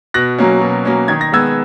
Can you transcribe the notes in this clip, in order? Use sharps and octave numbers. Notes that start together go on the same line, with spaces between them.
B2 F#6 A#6
F#3 A#3 C#4
B2
F#3 A#3 C#4
D#3 G#6
A#6
G#3 B3 E6 G#6